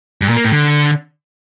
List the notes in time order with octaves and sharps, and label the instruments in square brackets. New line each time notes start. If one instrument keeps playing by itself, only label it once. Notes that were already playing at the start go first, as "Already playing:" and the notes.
[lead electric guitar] G2
A#2
A#3
A2
D3